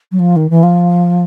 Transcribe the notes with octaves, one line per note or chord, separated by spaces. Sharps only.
F#3
F3
D#3
E3
F3